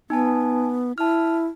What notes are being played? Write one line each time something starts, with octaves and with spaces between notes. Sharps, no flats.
B3 D#4 G#5 A5
E4 A5 F6